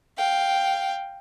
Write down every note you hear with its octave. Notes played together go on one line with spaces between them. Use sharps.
F5 G5